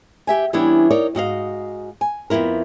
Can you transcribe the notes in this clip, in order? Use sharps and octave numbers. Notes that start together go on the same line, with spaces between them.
G4 E5 G#5
E3 G3 B3 C#4 D4 E4
D#4 A#4 C#5 D5
G#2 F#4 D#5 F5
G#5
F2 B2 B3 E4 A#4